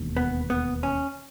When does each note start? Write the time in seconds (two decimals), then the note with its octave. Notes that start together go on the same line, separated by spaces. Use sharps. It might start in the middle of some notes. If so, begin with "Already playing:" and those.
Already playing: E1 D#2
0.17 B3
0.50 B3
0.83 C#4